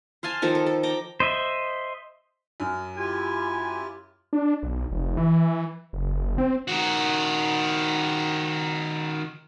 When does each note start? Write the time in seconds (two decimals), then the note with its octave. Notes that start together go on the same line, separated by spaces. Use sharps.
0.23 C5 F5 G#5 A5
0.42 D#3 F3 A4
0.55 A4
0.66 A4
0.83 G5 A#5 D6
1.20 C5 D#5 E5
2.60 F#2 F6
2.97 E4 F4 G4 G#5
4.33 D4
4.63 B1
4.91 F1
5.17 E3
5.93 F#1
6.38 C4
6.68 D#3 F#4